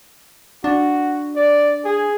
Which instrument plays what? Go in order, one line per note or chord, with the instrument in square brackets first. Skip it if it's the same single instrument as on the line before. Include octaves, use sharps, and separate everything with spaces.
[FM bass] D4 [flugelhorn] F#4
[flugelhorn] D5
G#4